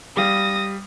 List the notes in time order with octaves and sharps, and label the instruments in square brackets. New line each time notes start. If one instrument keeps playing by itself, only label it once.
[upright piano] G3 F5 [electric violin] D#6 A#6